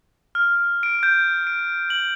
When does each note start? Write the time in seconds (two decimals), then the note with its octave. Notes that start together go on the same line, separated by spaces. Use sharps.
0.35 F6
0.83 D7
1.03 G6
1.47 D7
1.90 F#7